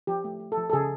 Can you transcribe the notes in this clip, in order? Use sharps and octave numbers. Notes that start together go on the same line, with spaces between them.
F3 G4
A3
A3
A4
F3
A4
C#3 G#4